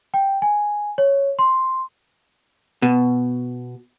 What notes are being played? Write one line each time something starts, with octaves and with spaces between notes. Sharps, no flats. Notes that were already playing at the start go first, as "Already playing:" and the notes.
G5
G#5
C#5
C6
B2